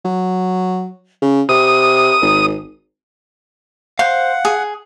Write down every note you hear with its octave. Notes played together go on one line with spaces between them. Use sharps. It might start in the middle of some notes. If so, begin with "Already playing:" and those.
F#3
C#3
C3 D#6
G#1
C5 F5 F#5
G#4